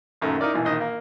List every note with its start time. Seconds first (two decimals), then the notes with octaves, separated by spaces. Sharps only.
0.21 A#1 F#2 D#3 A3
0.41 D#4 E4 A#4 D5
0.53 A#1 B2 E3
0.65 A#1 D#3 D#5
0.80 A#3